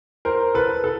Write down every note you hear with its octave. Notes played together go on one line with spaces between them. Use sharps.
A#4 C5
A4 B4
A4